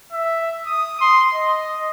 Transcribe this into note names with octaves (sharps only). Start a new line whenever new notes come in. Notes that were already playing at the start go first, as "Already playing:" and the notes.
E5
D#6
C6
D#5